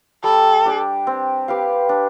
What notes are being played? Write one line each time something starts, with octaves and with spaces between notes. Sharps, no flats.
G3 A4
D4 G4 D5
C4
G4 B4 F5
D4